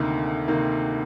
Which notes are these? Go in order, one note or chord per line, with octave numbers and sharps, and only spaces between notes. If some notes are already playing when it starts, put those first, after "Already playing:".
Already playing: D2 C3 D#3 A#3
C3 D#3 A#3